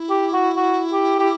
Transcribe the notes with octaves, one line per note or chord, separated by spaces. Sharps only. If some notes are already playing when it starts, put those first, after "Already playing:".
Already playing: E4
G4
F#4
F#4
G4
G4